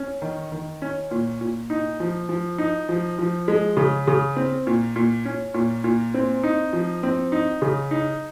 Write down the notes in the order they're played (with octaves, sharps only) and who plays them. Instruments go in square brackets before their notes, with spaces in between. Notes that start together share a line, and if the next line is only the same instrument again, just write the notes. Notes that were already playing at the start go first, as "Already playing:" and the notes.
Already playing: [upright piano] C#4
D#3
D#3
C#4
A#2
A#2
D#4
F3
F3
D#4
F3
F3
G#3
C#3
C#3
C4
A#2
A#2
C#4
A#2
A#2
C4
D#4
F3
C4
D#4
C#3
D#4